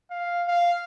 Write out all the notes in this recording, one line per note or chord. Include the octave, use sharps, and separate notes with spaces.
F5
F5